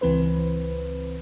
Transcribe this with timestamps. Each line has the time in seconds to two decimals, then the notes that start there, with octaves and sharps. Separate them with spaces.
0.01 C#2 E3 C4 B4 C5